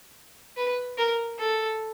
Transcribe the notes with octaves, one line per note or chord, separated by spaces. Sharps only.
B4
A#4
A4